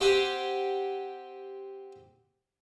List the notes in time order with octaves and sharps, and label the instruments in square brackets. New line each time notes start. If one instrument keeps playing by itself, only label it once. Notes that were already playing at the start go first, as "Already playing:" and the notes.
[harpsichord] C4 G4 C5 F#5 G#5